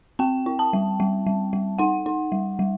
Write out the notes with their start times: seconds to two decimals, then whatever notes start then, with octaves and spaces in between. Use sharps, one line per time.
0.19 C4 G5
0.46 E4
0.59 A5
0.73 G3
1.00 G3
1.27 G3
1.53 G3
1.78 D#4 F#5
2.06 D#4
2.32 G3
2.59 G3